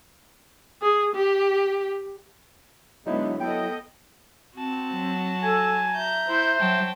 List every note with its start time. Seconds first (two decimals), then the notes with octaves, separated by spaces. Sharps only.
0.82 G#4
1.15 G4
3.07 D3 F#3 G#3 B3 D#4 E4
3.41 B3 A4 D#5 G5
4.55 C4 F#4 A5
4.92 F#3
5.43 A4 G#5
5.93 E5 A#5 G6
6.29 E4 C5
6.60 F#3 G5 A5